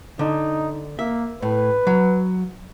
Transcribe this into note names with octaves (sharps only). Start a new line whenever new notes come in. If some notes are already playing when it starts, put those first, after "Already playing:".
D3 D#4
A#3 E5
A2 B4
F#3